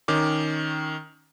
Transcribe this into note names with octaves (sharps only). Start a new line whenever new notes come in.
D#3 C#4 D6